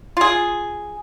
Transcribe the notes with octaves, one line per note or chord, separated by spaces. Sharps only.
F4 G#4